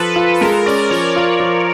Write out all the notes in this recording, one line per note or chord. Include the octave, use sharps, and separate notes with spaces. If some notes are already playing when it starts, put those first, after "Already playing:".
Already playing: F3 A4 B4
F4
A4
G#3 A#4
C#4 D5
F3 C#5
F4
F3